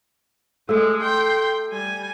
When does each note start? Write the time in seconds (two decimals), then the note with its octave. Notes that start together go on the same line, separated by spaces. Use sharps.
0.69 G#3 A3 A4 E6
1.01 G5 C6
1.69 G3 G#5